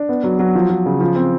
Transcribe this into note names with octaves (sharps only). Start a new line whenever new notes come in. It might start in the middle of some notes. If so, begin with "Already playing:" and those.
Already playing: D4
B3
F#3
F#3
F3
F3
C#3
F3
C4